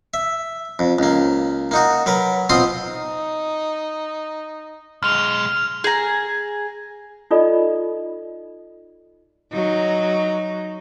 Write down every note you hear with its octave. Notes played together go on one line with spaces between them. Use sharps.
E5
F2
C#2 A#3
A#3 D#4 F#4
F#3 A#4 B4
B2 C4 F4 F5 C6 D#6
D#4
B1 G#3 F6 F7
G#4 A#5
D#4 F4 A4 D5 D#5 B5
F#3 D#4